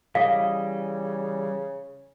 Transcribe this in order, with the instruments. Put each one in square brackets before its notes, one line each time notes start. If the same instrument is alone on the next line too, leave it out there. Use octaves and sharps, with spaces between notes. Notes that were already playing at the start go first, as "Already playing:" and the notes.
[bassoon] C#3 [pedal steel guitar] E3 G3 D#5 [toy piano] F5